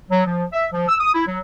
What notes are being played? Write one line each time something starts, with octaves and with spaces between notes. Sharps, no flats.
F#3
F3
E5
F3
E6
D#6
E4
F#3